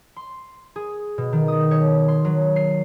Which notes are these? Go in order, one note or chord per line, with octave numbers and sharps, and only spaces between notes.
C6
G#4
B2
D#3
D#6
C#5
C6
F#3
C7